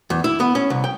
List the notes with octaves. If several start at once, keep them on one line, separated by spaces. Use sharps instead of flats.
E2
E4
B3
C#4
C2
G5